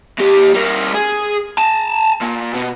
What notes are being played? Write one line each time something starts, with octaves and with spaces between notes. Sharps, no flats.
D#2 G4
G3 A#4
G#4
G#5 A5
A#2
B2